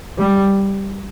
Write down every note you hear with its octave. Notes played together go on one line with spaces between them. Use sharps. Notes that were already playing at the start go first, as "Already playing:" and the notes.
G3